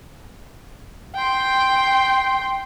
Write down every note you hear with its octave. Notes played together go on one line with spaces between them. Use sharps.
G5 C6